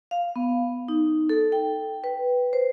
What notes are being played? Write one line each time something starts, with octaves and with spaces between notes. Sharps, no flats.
F5
B3
D#4
A4
G5
B4
C5